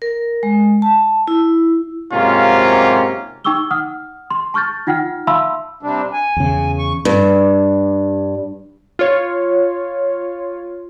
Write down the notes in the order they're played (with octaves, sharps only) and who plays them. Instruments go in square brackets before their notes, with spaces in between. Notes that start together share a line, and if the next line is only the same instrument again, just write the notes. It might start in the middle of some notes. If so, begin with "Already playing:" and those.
[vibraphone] A#4
G#3
A5
E4
[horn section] G#2 C3 F#3 A#3 C#4 F4
[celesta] D#4 G5 C#6 D6 E6 G7
F#5 D#6 F6
C6
A5 C#6 F6 G6 A6
D#4 F4 F#5 G5 F6
E5 F5 A5 B5 C6 E6
[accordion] C3 G3 D4
G#5
[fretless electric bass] E2 C#3
[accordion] C#6
[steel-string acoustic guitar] G2
[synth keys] F4 C#5